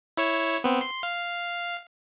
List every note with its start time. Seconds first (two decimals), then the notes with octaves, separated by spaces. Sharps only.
0.17 E4 C#5 E6
0.64 B3 C4
0.81 C6
1.03 F5